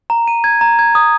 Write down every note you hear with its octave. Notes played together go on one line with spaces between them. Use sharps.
A#5
D#7
G#6
A#5
G#6
D#6